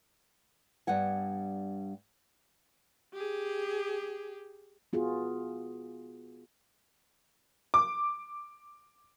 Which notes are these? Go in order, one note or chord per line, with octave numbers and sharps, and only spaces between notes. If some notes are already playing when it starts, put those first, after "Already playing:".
G2 G3 B3 F#5 G#5
G4 G#4
B3 F4 F#4 G#4
D6